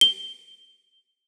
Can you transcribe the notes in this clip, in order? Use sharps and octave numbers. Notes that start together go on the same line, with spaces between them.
G7